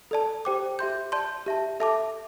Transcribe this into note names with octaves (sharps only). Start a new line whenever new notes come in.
A4 D5 A5
G4 C5 G5 D6
G4 E5 C6 G6
D5 A5 C6 G6
G4 E5 A5
A4 E5 A5 D6